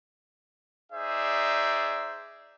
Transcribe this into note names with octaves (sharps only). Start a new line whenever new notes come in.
D#4 G#4 C5 D5 E5